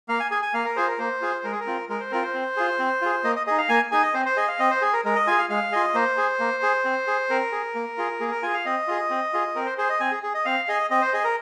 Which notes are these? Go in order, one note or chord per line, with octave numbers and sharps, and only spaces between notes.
A#3 F5
G#5
G#4 G#5
G#5
A#3 F5
A#4
F4 G#4 C5
A#4
A#3 C5
F4 G#4
G#3 A#4
G#4
A#4
C4 F4
G#3 A#4
C5
C4 F4 A#4
C5
C4
F4 G#4
C4
F4 G#4
A#3 D#5
D#5
D#4 G#4 D#5
F5
A#3 G#5
D#4 G#4 G#5
D#5
C4 C5
C5
G#4 D#5
F5
C4 D#5
C5
G#4
A#4
G#3 A#4
D#5
F4 G#4 G#5
F5
G#3 F5
F4 G#4 D#5
A#3 C5
G#4
A#3
G#4
C4
G#4
C4 A#4
G#4
A#3
F4 G#4
A#3 G#4
A#4
F4 G#4 G#5
F5
C4 D#5
F4 G#4
C4
F4 G#4
C4 A#4
C5
G#4 C5
D#5
C4 G#5
G#4
G#4
D#5
C4 F5
G#4 D#5
C4 D#5
C5
G#4 D#5
A#4